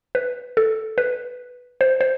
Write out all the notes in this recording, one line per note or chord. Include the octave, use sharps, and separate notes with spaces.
B4
A4
B4
C5
C5